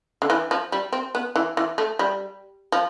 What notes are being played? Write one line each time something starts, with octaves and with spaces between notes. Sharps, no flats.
D3
E3
F3
G3
C4
B3
E3
E3
A3
G3
F3